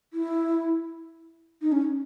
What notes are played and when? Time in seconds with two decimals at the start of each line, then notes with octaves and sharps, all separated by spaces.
0.13 E4
1.62 D#4
1.72 C#4